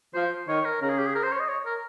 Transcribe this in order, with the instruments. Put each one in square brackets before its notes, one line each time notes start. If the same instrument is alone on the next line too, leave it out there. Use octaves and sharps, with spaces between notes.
[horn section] F3 [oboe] C5
[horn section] D#3 [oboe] C#5
[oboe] A#4
[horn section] C#3 [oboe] A#4
[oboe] G#4
G4
G#4
A#4
C5
C#5
D#5
C#5
A#4